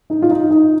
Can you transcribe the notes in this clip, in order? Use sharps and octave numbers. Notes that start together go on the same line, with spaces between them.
D#4
F4
D#4
D#4